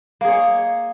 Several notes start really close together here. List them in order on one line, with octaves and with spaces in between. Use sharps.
A#3 G#4 C#5 D#5